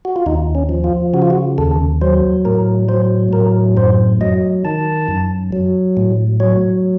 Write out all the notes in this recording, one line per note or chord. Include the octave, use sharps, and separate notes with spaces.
F#4
F4
D#2 D#4
C#4
F3
F4
C#3 F#4
F4
F#4
D#2 A4
F#3 C5
A2 A#4
F#3 C5
A2 A#4
F#2 C5
F#3 D#5
D#3 A5
F#2
F#3
A2
F#3 C#5